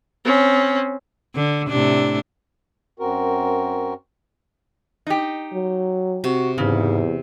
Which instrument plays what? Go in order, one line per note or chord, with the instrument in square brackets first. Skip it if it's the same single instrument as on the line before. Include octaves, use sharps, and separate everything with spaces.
[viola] C4 C#4
[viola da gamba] D3
A2 C3 D4
[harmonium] F#2 C4 F#4 A#4
[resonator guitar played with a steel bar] D#4 G4
[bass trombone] F#3
[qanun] C3 [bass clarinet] F#4
[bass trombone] E2 [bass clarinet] G#2 [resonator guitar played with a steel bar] C#3